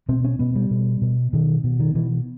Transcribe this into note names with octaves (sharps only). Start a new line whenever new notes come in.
B2 C4
C#4
B2 B3
G3
B2
B2
B2 D#3
B2
D#3
B2 E3